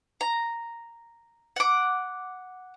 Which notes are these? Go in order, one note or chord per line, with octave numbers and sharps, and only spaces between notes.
A#5
F#5 D6